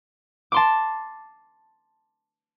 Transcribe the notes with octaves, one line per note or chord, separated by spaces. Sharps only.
A5 C6 D6